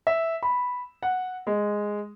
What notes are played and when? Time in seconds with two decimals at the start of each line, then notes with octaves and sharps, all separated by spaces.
0.07 E5
0.43 B5
1.03 F#5
1.47 G#3